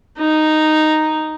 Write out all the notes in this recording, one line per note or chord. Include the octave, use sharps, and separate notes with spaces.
D#4